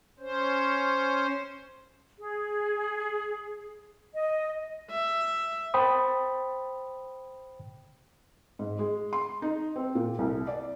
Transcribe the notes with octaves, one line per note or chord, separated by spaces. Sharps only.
C#4 C5
G#4
D#5
E5
C5 G5 B5 D#6
G#2
G#3
C6
D#4
C4
A#2
C2
D5